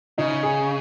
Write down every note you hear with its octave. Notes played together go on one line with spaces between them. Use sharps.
C#3 D#4
G#4